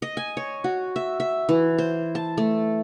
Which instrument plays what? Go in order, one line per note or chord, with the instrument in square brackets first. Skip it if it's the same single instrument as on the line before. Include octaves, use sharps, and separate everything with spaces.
[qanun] D#5
G#5
C#5
F#4
E5
E5
E3
C5
A5
A3